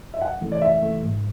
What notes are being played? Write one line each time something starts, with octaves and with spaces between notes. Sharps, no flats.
E5
F#2 F#5
E3 A3
D5
F#2 E5
E3 A3
G#2